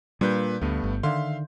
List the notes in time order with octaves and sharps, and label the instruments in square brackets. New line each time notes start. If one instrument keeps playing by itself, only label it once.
[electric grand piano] A#2 B4 G6 [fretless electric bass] G3 D4
[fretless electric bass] D2 [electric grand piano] G2 A3 B3
[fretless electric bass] G1
[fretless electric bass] D3 D#3 [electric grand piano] E5 F5 C6